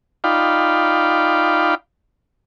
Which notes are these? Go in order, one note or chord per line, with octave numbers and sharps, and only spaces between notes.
D#4 F4 D5 F5 G5 B5